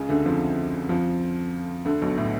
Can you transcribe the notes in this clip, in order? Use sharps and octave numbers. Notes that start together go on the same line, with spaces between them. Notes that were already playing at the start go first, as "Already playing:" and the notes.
Already playing: C#2 C#3
D2 D3
F2 F3
F2 F3
D2 D3
B1 B2
A2